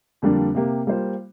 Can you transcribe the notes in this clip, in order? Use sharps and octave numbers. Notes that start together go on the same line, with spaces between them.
F2 D3 G3 A#3 D4
C3 A#3 G4
G3 A#3 F4 C5